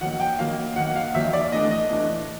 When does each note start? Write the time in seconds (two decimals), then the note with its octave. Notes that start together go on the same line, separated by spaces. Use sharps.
0.01 D#3 F#3 A#3 F#5
0.20 G5
0.39 D#3 F#3 A#3 F5
0.76 D#3 F#3 A#3 F#5
0.96 F5
1.14 D#3 F#3 A#3 E5
1.33 D5
1.52 A2 E3 A3 D4 D#5
1.71 D#5
1.90 A2 E3 A3 D4